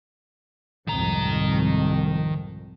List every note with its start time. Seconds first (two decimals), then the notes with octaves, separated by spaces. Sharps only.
0.87 C2 F2 G#2 D#3 A#5